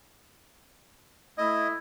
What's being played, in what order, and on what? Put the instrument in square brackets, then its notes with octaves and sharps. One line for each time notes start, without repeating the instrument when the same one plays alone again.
[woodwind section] A3 E4 [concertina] D#5